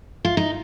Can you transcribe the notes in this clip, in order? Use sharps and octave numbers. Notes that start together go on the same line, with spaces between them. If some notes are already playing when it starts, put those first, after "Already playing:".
F4
D#4